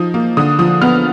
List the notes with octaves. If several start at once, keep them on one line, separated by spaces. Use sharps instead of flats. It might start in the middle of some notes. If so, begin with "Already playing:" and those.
Already playing: F3 D#4 D#6
A#3
D3 D#6
F3 D#6
B3 F6